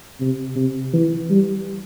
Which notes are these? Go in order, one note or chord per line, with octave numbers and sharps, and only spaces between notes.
C3
C3
E3
G3